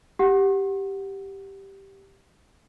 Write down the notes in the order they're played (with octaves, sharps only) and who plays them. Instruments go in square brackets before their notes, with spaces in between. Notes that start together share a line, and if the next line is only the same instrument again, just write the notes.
[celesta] G4 F#5